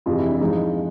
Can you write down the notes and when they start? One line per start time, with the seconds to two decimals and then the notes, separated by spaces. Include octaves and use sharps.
0.06 F2 C3 E3 G#3 F4
0.18 E4
0.29 D4
0.41 G#2 F3 G#3 D#4